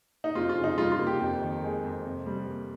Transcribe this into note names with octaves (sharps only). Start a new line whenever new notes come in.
D#4
F2 F4
F4
C#3
D#4
G3 F4
F4
A#3
G4
F2
D#3
G#3
F2
C3
G3
A#3